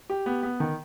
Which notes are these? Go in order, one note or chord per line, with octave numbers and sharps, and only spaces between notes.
G4
B3
B3
D#3